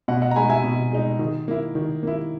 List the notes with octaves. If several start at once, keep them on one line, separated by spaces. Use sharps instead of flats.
B2 D#5 F#5
D#5 F#5
A#5
G#3 D#4 G#5 B5
E5 G#5
B2
G#3 D#4
D#3
A#3 E4
D#3
A#3 E4